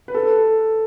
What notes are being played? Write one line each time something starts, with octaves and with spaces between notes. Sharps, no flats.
B4
A4